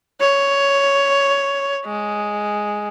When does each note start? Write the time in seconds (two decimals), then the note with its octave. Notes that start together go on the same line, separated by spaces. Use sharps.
0.21 C#5
1.85 G#3